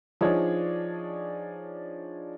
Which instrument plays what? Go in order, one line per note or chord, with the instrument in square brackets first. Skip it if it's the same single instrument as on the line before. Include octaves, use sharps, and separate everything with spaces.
[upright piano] F3 D4 D#4 G#4 C#5